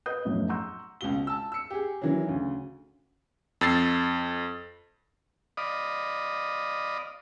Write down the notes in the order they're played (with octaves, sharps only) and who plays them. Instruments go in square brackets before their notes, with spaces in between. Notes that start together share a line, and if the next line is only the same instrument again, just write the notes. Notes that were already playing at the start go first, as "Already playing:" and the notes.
[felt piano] B4 D#5 D#6 G6
F1 B1 F#2 A2
F#5 A#5 C6 C#6 E6 G6
[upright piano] C#2 B2 F#4 G7
A5 E6
E6 C#7
G4 G#4
D#3 E3 F#3
D2 C#3
[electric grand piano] F2 E6 A6 C7
[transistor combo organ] D5 D#5 F5 B5 D#6